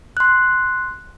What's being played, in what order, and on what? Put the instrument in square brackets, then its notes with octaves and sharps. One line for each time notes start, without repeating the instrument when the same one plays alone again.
[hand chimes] C6 F#6